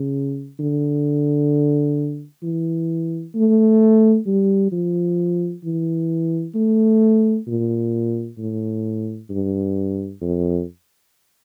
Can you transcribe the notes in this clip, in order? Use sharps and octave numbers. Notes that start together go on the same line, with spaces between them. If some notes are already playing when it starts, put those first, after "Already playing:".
Already playing: C#3
D3
E3
A3
G3
F3
E3
A3
A#2
A2
G2
F2